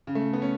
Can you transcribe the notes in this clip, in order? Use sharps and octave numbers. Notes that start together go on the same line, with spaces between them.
C#3
A3
B3
C#4